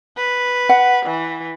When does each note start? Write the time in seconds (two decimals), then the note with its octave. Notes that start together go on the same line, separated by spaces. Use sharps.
0.17 B4
0.69 F#5
1.06 E3